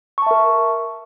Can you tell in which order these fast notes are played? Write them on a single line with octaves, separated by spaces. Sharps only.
C#6 A5 E5 A#4